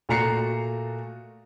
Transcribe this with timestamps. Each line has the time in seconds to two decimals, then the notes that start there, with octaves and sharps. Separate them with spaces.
0.09 A#2 A3 F#4 A#5 C7 C#7